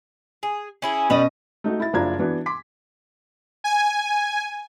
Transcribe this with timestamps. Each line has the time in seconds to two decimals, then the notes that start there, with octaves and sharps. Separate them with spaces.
0.43 G#4
0.82 C#4 E4 G#4
1.10 B2 G3 C#4 B4 D#5
1.64 A3 D#4 F#4
1.80 E4 A6
1.93 F#1 F3 D4 E4 A#5 G#6
2.19 E3 B3 D4 F#4
2.46 C6 D6 B6
3.64 G#5